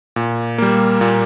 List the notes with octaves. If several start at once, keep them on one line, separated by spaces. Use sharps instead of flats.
A#2
G3 A#3
A#2